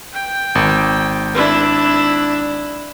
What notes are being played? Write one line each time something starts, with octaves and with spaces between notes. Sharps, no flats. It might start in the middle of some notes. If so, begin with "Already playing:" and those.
G5
G#1
D4 E4